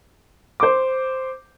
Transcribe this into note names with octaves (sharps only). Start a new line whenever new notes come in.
C5 D6